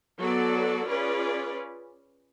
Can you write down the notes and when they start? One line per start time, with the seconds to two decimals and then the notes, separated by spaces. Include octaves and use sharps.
0.19 F#3 B3 F#4 A4 D5
0.87 C#4 F4 G#4 B4 D5